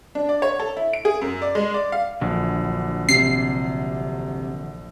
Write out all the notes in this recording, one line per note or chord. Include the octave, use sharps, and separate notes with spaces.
D4
D5
C#5
A4
E4
D7
G#4
F#2
D5
G#3
D5
F5
A#1 D3 E3 F#3
C3 C7